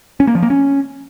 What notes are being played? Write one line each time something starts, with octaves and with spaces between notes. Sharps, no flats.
C#4
A#3
F3
A#3
C#4